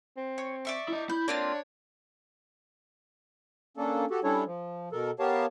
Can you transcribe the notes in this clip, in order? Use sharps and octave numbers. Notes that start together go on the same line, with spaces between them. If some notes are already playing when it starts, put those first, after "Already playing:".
C4
C#5
D5 E5 C#6
E4 D#5
E4 B5 G6
A#3 C4 D4 F4 C#5
A#3 C#4 D4 A4
F#4 G4 A4
G3 C#4 D4 E4 A4 C#5
F3
B2 A4 A#4
B3 G4 A#4 C#5 F5 A5